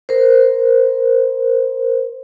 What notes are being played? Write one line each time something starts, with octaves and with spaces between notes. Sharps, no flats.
A#4 C5